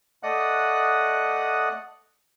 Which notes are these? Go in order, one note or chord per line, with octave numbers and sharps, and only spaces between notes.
A3 D5 D#5 F#5 D#6 F#6